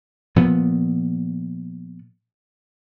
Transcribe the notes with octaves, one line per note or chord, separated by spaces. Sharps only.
A#2 F3 B3